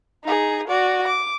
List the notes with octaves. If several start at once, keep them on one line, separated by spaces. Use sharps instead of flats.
D#4 G#4
F#4 D5
D6